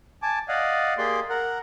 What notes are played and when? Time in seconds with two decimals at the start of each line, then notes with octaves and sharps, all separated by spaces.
0.23 G#5 A5 D6
0.49 D5 D#5 F5 F#5
0.98 A#3 G4 G#4 D5 C6
1.29 A#4 F#5